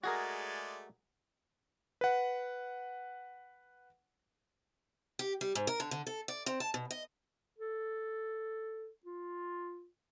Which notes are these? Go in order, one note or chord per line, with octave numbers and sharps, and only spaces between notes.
G#3 A3 F#4 G#4 A#4 D5
B4 F#5
G4
G3
G#2
A#4
D3
D3
A4
D5
C4
A5
B2
D#5
A4
F4